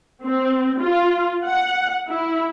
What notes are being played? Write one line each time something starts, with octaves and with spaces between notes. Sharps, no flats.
C4
F4
F#5
E4